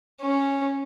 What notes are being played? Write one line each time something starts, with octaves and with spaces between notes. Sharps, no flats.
C#4